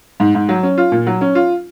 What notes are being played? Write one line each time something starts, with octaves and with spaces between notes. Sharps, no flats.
G#2
G#2
F#3
C#4
F4
A#2
F#3
C#4
F4